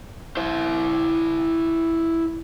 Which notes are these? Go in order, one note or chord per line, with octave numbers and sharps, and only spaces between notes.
E4 C5